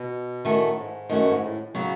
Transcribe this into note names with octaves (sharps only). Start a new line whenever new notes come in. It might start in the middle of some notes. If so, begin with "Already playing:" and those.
Already playing: B2
A2 D#3 A3 C#4 F#4
G#2
F#2 D#3 A3 C#4 F#4
G#2
A2
C#3 F#3 B3 F#4